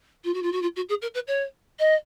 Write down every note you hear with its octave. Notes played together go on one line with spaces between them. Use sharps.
F4
F#4
F4
F#4
F4
F#4
G#4
A#4
B4
C#5
D#5